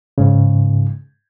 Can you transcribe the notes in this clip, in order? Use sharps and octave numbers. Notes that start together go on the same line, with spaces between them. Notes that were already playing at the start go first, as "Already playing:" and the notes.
G#2 C#3